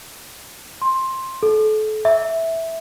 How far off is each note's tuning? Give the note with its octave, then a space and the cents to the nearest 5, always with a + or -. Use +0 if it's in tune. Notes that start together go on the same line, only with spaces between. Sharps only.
C6 +15
A4 -35
E5 -5